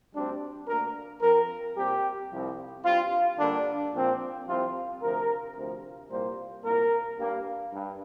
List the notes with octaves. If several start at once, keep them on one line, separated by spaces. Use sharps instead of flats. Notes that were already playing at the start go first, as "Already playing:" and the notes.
D2 D3 G3 C4 D4
D2 D3 A#3 A#4
F2 F3 C4 A#4
A#2 G3 C4 G4
C2 C3 F3 C4
G2 G3 C4 F4
G2 D3 G3 A#3 D4
A#2 F3 C4
C2 C3 F3 C4 F4
D2 C3 F3 A#4
D2 C3 F3
C2 A#2 G3 A#3 C5
C2 A#2 A#3 A#4
G2 G3 A#3
G2